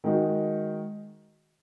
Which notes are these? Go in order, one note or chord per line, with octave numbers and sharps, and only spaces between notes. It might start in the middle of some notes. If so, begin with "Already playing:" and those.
D#3 G#3 D#4 F#4